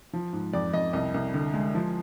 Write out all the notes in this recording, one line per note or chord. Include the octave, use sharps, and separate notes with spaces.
F3
G#2
F2 D5
F2 D#5
C2 D#5
C2
D3
G#3
F3